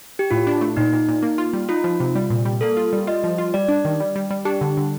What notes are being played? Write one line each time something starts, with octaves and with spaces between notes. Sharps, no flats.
G4
A2 F4
D4
A3
A#2 D#4
A#2
A#2
A#3
F4
G3
D#4 F4
F3
C3
G3
A#2
G3
A#3 A4
F4
G3
F4 D#5
F3
F4
G3 D5
D4
D#3
G3
G3
G3
D4 G4
D3
D3